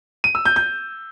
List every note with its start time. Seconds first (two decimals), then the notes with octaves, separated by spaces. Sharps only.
0.24 D#7
0.35 E6
0.45 G6
0.56 G6